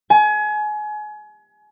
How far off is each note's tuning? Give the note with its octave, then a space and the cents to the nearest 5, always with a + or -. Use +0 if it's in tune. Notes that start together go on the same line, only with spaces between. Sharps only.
G#5 +30